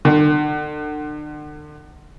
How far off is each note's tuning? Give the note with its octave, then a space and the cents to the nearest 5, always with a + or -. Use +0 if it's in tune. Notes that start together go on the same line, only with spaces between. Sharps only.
D3 +40